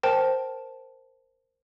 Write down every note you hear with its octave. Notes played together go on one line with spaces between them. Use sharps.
A#4 C5 G5 A5